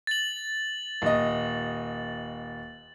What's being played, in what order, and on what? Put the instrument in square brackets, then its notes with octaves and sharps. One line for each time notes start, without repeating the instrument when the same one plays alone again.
[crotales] A6 F#7
[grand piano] D#1 D#5